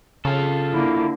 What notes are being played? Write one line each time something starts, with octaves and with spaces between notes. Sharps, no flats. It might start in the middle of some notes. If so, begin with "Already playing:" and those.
C#3 F4 A4
D3 A#3 E4